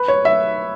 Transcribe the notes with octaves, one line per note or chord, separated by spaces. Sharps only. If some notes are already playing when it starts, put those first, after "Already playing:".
Already playing: B4
C#5
E5